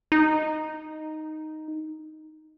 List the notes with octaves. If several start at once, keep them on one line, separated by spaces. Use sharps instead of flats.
D#4